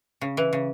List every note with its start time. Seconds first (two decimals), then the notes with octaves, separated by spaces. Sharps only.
0.21 C#3
0.37 E3
0.53 C#3